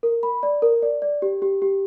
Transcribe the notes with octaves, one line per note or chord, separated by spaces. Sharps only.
A#4
B5
D5
A#4
D5
D5
G4
G4
G4